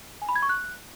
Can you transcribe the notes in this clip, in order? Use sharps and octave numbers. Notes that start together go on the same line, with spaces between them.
G#5
B5
G#6
C#6
F#6